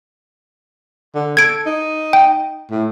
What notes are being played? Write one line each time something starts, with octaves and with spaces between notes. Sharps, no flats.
D3
A4 G#6 D7
D#4
G5
A2